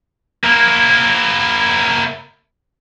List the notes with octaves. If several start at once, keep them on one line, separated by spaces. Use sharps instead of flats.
A#3 E4